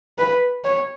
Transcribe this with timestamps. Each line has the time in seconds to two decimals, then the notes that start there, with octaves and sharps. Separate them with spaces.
0.18 B4
0.64 C#5